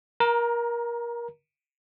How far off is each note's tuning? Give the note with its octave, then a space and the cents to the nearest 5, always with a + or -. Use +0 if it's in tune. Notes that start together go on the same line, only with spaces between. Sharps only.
A#4 +25 A#5 +0